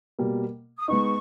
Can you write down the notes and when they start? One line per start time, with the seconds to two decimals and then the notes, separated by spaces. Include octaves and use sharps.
0.19 B2 G3 A#3
0.78 D#6
0.88 G#3 B3 D#4 C#6